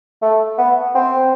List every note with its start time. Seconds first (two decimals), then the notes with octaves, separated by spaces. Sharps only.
0.22 A3
0.58 B3
0.95 C4